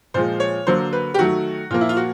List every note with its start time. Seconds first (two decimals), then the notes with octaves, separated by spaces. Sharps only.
0.14 A#2 F3 G#3 C5
0.40 C#5
0.67 D3 F#3 A#3 C5
0.93 B4
1.14 G4
1.19 D#3 F#3 A3 F#4
1.70 A#2 F3 A#3 F4
1.81 E4
1.89 F4
1.97 F#4